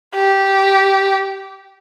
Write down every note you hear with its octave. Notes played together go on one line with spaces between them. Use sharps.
G4